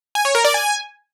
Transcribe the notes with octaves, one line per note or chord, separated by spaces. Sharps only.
G#5
C#5
A#4
D5
G#5